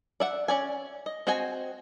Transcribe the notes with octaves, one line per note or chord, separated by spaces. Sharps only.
D5 E5 F#5
C#4 D5 G#5
D#5
C4 F#4 D#5 G5 G#5